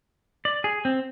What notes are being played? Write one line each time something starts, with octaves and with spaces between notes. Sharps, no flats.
D5
G#4
C4